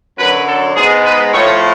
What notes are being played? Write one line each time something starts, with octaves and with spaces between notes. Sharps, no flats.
F#2 D3 F#3 B4
A4
G#2 G#3 B3 G#4
B4
A2 F3 A3 C#5